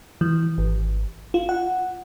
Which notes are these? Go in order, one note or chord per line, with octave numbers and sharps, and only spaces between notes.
E3
G#1
F4
F#5